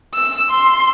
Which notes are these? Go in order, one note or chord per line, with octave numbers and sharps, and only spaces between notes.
E6
C6